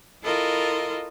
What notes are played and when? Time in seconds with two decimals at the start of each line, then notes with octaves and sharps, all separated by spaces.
0.23 E4 F4 A4 A#4 D#5